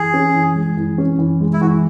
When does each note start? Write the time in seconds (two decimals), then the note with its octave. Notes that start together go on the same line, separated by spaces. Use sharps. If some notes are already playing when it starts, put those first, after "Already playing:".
Already playing: E3 G#4
0.14 C#4
0.34 E3
0.56 G#3
0.77 E3
0.98 C#4
1.19 E3
1.40 G#3
1.53 E4
1.61 E3 F#4